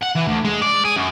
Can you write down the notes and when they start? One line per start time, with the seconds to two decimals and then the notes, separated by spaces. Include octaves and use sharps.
0.03 F#5
0.16 E3
0.28 D2
0.45 G#3
0.62 D5
0.85 G#4
0.97 F#2